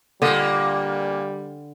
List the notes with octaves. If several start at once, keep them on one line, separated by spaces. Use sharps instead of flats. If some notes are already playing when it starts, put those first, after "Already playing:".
A#2 D3 G3 A#3 D#5